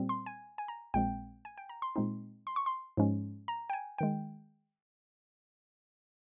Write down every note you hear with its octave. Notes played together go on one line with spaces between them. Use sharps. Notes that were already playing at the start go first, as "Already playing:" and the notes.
Already playing: A#2 G3 C4
C6
G#5
G#5
A#5
A#1 A#2 G#3 C4 G5
G#5
G5
A#5
C6
A#2 G#3 C4 D#4
C6
C#6
C6
G#2 F3 G#3 C#4
A#5
G5
G#5
D#3 G#3 G5